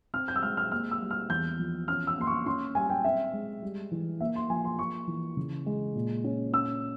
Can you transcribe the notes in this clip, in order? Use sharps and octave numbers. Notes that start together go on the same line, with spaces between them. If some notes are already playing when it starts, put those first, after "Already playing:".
C4 F6
G6
E6
G#3 F6
F6
A#3 F6
E6
G3
F6
E2 G6
F3
C#4 F6
E6
A#3 C6
C#6
C#4 C6
G3 G#5
G5
C4 E5
G#3
G3
E3
A#3 E5
C6
F3 G#5
C6
A#3 C#6
E3
C#3
G#3
A#2
C#4
C#4 E6